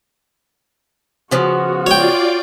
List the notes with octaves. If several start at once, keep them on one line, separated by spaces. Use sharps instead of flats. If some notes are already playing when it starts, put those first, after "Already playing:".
C#3 F3 B3 F#4
F4 C#5 D5 G5